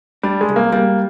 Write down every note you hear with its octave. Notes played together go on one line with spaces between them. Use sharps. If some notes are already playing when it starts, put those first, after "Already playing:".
G3 D4
G#3
C2
A#3
G3 A#3